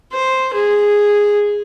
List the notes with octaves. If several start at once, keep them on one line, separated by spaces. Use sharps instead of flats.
C5
G#4